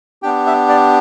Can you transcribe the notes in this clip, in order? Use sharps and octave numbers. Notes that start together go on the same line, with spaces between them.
B3 D4 G4 G5
E5
D5